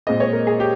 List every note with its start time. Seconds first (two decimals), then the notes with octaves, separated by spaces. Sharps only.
0.07 A#2 G#3 C4 D#5
0.20 C#5
0.33 A#4
0.47 G#4
0.60 G4